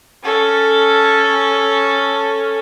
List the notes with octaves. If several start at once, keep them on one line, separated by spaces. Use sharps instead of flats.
C#4 A4